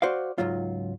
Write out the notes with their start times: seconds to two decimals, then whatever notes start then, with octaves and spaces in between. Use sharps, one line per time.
0.02 F#4 C5 D5 F5
0.38 C#2 G#2 F#3 F4